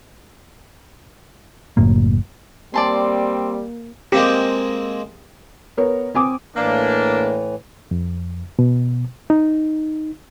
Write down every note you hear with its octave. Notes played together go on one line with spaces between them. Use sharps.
F#1 F#2 A2 A#3
G3 A#3 C4 D5 A5 C6
G#3 A#3 C4 G4
B3 A#4 C#5
C4 G#5 D6 D#6
A2 E3 A#3 D4
F2
B2
D#4